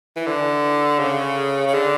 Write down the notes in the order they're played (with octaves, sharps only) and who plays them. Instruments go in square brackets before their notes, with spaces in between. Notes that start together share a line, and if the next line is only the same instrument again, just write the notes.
[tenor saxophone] E3
D3
C#3
C#3
D3